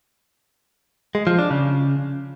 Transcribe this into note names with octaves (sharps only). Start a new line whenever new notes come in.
G#3
F3
D4
C#3